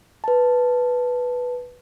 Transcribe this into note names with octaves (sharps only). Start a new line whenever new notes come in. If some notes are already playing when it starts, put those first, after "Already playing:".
B4 A5